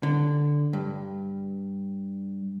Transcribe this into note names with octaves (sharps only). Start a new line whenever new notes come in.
D3
G2